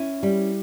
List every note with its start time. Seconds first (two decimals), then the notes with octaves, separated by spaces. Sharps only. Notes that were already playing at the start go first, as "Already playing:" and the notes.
Already playing: C#4 E4
0.23 G3